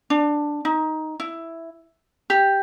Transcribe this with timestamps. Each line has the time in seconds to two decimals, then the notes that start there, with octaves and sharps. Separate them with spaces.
0.10 D4
0.65 D#4
1.20 E4
2.30 G4